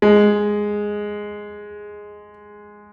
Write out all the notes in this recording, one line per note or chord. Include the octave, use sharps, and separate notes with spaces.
G#3